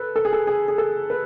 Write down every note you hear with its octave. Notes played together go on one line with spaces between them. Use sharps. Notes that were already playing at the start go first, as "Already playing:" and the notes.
Already playing: A4 B4
A4
G#4
A4
G#4
G#4
A4
B4